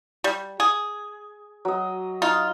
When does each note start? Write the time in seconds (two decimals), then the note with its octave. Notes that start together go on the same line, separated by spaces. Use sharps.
0.24 G3
0.60 G#4
1.65 F#3 D#5
2.22 D#4 F4